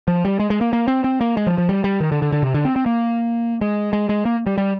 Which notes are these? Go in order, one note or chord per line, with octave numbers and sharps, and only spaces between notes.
F3
G3
G#3
G#3
A#3
A#3
C4
C4
A#3
G#3
F3
F3
G3
G3
D#3
D3
D3
D3
C3
D3
C4
C4
A#3
G#3
G#3
G#3
A#3
G3
G3